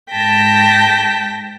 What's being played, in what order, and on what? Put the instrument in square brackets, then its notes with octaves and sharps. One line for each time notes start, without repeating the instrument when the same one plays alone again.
[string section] G#2 A#6 B6 [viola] G5 A5